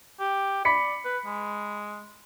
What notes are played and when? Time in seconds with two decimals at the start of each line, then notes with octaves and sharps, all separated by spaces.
0.20 G4
0.65 D5 B5 B6 C#7
1.05 B4
1.26 G#3